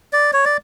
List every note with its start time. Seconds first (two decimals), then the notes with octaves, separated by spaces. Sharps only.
0.13 D5
0.33 C#5
0.45 D5